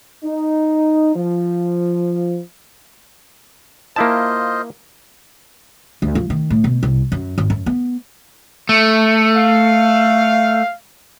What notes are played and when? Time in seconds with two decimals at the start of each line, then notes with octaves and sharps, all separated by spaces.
0.24 D#4
1.15 F3
3.96 A#3 E4 F4 C5 D#5 A5
6.02 D2
6.15 F3
6.30 D#3
6.50 A2
6.64 B2
6.83 C2
7.12 F#2
7.38 G#1
7.50 F#2
7.66 B3
8.69 A3
9.37 F5